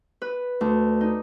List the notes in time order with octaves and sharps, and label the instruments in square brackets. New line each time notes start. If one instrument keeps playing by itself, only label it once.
[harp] B4
D2
D#4